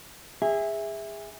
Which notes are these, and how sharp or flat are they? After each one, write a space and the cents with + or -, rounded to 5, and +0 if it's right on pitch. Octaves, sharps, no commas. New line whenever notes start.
G#4 -25 E5 -5